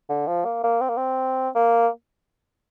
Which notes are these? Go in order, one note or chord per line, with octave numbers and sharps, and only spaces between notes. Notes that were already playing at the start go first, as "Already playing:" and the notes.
D3
F3
A#3
A#3
C4
A#3
C4
A#3